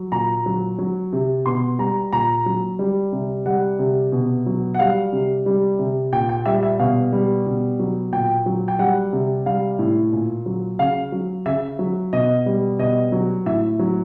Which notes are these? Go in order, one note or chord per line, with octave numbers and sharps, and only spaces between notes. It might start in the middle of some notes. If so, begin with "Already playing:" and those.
Already playing: F#3
A#2 A#5
F#3
F#3
C3
B2 C6
G3 A#5
A#2 A#5
F#3
G3
C3
G3 F#5
C3
B2
F#3
F#5
G3 F5
C3
G3
C3
A#2 G5
G5
G3 E5
E5
B2 F5
G3
B2
F#3
A#2 G5
F#3
G5
G3 F#5
C3
G3 F5
A2
A#2
F#3
C#3 F5
F#3
C#3 E5
F#3
B2 D#5
G3
B2 D#5
F#3
A2 E5
F#3